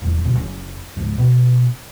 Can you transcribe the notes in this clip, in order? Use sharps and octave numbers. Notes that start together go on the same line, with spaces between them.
D1 E2
D2 B2
F#1 C#4
C#2 G#2
B2